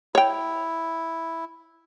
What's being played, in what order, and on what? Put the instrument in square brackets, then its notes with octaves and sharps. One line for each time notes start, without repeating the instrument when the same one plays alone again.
[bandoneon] E4 [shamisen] C#5 G5